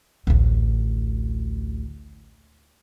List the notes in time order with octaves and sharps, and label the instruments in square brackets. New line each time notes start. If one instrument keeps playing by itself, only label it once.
[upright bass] A1 D2